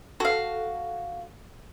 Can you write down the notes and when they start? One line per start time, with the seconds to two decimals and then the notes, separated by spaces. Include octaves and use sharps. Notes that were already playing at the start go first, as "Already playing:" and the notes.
0.20 F#4 A4 F5